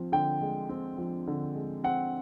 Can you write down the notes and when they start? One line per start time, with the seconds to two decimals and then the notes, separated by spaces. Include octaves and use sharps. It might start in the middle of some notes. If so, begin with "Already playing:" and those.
Already playing: F3 C4
0.12 D3 G5
0.41 G#3
0.69 C4
0.98 F3
1.27 D3
1.55 G#3
1.84 C4 F#5